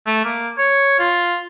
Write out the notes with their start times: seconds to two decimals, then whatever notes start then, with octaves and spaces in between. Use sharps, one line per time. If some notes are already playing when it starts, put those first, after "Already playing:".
0.06 A3
0.25 A#3
0.58 C#5
0.99 F4